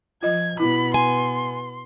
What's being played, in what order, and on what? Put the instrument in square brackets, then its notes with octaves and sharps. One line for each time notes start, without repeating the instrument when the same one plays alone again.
[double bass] F3 [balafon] F4 D#5 [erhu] G#6
[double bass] B2 B3 [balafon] E4 [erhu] B5
[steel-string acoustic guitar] G#5 [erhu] C6